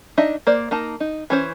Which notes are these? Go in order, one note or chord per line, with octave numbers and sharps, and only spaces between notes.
D4 D#4 D#5 E5
A#3 C5 D5
A#3 D#4 A5
D#4
E3 C#4 C5